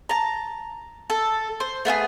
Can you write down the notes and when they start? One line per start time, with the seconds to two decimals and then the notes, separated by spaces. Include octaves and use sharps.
0.09 A5 A#5
1.10 A4
1.60 C5
1.85 A3 B3 E4 G#4